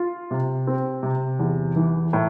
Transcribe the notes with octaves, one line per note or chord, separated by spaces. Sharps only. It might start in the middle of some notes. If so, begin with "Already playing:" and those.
Already playing: F4
C3
C4
C3
E2
E3
A2